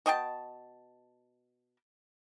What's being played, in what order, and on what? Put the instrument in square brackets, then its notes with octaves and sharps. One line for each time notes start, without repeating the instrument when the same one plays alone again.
[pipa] B2 D#5 G5 A5